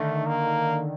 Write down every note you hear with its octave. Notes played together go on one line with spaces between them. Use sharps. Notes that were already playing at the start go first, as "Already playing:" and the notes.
Already playing: D3 D#3 A3
A#3